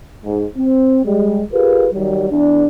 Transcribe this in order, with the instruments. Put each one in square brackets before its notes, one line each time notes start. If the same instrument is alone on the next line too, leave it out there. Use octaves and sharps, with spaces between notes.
[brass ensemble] G#2
C4
G3 G#3
F4 G4 G#4 A#4 B4
D#3 F#3 G3
E2 D4